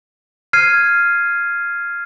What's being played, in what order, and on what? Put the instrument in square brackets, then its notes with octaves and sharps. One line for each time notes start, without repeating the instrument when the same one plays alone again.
[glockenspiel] F6 G#6 C7 D#7